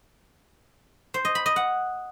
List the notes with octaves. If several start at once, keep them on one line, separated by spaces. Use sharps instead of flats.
C5
D#5
B5
D#5
F#5